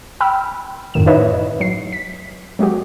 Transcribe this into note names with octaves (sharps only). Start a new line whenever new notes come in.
G5 B5 E6 F6
F#2 A2 D#3 E7
D#4 E4 B4 C#5 D#5 E5
F#3 C7
B6
F#3 G#3 F#4 G4